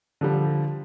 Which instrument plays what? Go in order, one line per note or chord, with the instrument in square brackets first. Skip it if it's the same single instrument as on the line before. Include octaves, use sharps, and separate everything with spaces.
[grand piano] D3 F3 G3